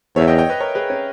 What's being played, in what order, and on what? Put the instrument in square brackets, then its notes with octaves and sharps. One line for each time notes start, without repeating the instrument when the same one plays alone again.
[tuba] E2 [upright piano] C#5 E5
[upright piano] D#5 G5
D#5 G5
B4 D#5
A#4 C#5
G#4 B4
C#4